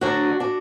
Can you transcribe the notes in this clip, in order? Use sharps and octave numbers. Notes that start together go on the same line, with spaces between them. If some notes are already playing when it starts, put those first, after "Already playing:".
D2 D3 F#3 D4 F#4
D4 F#4